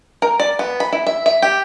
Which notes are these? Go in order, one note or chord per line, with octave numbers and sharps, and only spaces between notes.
A#4
D5
B3
B5
E4
E5
E5
G4